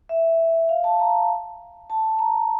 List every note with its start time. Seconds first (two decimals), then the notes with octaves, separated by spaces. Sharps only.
0.09 E5
0.69 F5
0.84 A5
1.00 A#5
1.90 A5
2.19 A#5